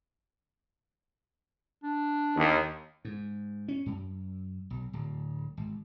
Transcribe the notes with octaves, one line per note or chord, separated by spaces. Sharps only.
D4
D#2
G#2
C#4
F#2
B1
D1
G#1